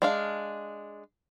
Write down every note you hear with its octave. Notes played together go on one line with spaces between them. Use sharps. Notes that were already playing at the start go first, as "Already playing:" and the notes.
G#3 D4 F5